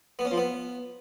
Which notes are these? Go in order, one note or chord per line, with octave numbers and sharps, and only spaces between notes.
B3
C#4
F3
B3